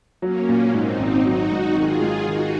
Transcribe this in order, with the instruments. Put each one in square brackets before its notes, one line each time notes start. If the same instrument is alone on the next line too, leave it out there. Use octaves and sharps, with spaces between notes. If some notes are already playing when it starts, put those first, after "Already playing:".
[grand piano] F#3 [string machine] A#3 C#4
[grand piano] A#2
[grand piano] G#2 [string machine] C4 D#4
[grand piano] G#1
[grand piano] F#3 [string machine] D#4 F#4
[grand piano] G#2
[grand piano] D#3 [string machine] F4 G#4
[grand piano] G#2
[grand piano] D#3 [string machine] D#4 F#4